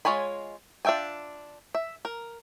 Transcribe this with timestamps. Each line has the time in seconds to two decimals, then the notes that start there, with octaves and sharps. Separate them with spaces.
0.05 G#3 F4 C#5 G#5 B5
0.85 D4 F4 E5 G5 G#5
1.75 E5
2.05 A#4